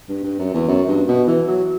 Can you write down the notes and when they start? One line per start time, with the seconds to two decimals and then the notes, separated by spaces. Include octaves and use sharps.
0.09 G2
0.24 G2
0.39 F#2
0.54 E2
0.68 F#2
0.88 G2
1.08 B2
1.27 E3
1.48 F#3